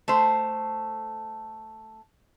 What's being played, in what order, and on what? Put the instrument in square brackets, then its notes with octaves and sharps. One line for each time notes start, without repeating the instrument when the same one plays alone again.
[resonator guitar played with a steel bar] A3 C5